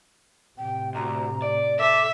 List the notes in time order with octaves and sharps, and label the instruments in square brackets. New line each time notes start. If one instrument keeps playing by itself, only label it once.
[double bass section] A2 C3 [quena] G5
[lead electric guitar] D2 [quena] A#5
[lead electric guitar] D5
[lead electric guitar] A4 [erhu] E5 [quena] D6